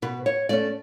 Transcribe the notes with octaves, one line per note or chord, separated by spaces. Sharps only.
B2 B4
C#5
A3 C#4 D5